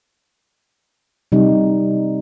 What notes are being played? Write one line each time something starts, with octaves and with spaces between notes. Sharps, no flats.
C3 G3 D#4